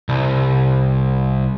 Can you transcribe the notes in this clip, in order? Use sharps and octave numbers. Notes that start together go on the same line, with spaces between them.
C2